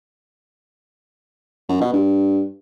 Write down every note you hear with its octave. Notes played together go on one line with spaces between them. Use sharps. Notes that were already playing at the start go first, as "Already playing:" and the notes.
F#2
B2
G2